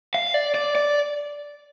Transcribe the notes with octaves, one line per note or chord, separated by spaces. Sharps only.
F5
D5
D5
D5